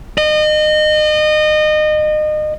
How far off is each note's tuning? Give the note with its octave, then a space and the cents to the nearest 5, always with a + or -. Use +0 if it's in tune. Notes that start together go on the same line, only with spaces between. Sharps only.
D#5 -30